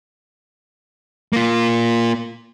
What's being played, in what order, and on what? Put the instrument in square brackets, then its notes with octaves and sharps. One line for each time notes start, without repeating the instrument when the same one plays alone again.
[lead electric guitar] A#3 F4